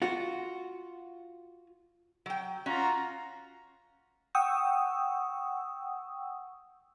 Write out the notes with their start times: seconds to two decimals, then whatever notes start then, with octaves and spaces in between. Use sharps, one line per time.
0.02 F4 F#4
2.26 F#3 G5
2.66 C#4 F4 F#4 A#5
4.35 F#5 G5 C#6 D#6 E6